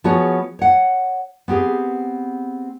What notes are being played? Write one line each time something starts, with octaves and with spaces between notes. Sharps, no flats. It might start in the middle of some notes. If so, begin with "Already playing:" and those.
F3 B3 F#4 G#4 C#5
C#5 F#5
B3 C4 G4 G#4